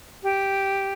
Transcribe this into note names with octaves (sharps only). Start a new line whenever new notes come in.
G4